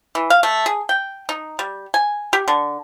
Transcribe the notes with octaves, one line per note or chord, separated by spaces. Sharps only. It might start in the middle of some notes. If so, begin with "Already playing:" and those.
E3
F5
A3
G#4
G5
D#4
G3
G#5
G4
D3